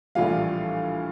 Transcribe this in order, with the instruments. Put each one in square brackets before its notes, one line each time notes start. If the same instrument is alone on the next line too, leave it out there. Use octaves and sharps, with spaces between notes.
[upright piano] A#1 A2 E3 G3 F4 F5